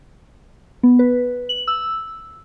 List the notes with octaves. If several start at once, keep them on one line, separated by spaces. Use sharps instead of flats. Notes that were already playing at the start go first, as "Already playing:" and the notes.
B3
B4
F#7
E6